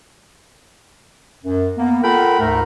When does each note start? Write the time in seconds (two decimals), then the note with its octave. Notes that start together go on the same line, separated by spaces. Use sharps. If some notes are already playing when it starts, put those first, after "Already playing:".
1.43 F#2
1.78 A#3 B3
2.02 F4 A4 A#4 F#5 G5 B5
2.40 D2 G#2 A3 A#4